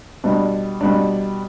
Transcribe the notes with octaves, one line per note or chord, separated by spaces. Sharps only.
B2 G3 D4
B2 G3 D4